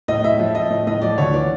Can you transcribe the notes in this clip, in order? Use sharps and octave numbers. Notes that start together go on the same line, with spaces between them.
A2 D#5
A2 E5
F3
F3 D#5
A2
A2 D#5
F3 D5
D2 C#5
E3 D5